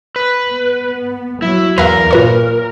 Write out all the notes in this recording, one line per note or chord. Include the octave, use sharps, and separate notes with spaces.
B4
B3
F#3 E4
E2 A#4 B4 E5 F5
A#2 F4 B4 C#5